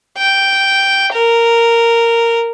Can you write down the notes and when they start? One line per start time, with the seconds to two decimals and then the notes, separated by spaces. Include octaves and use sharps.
0.18 G5
1.13 A#4